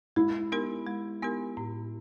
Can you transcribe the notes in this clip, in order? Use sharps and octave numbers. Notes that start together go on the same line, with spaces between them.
G#3 E4
B3 D#4 G4 A#4
G#3
B3 D#4 G4 A#4
A2